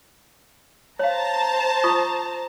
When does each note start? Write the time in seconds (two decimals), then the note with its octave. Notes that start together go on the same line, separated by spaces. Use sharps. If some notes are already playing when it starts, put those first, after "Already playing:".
0.99 C5 C#5 F5 A5 A#5
1.84 F4 C#6 D#6